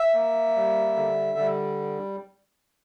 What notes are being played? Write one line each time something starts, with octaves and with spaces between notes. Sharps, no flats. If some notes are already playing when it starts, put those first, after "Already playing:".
Already playing: E5
A#3
G3
D3
G3